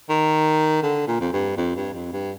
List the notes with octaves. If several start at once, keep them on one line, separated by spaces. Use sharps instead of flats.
D#3
D3
A#2
F2
G2
F2
G2
F2
G2